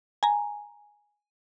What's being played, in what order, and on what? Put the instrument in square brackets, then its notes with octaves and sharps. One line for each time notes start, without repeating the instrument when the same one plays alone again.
[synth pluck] G#5 A#5